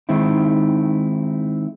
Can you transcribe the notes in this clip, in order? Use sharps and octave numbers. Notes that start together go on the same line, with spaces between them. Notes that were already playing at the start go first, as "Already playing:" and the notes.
D#3 G#3 C4 D#4 E4